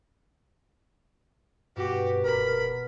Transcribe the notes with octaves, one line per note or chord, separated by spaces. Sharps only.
G2 B2 F#4 G4
F1 A#4 B5